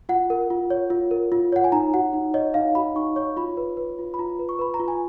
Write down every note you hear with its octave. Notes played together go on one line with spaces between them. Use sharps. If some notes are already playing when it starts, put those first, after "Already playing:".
F4 F#5
A#4
F4
C#5
F4
A#4
F4
C#5 F#5
G#5
D#4 A#5
F#4 F#5
D#4
C#5 D#5
D#4 F5
F#4 B5
D#4 C#6
C#5 C#6
F4 B5
B4
B4
F4
B5
F4 A#5
B4
C#6
B4 B5
A#5
F4
G#5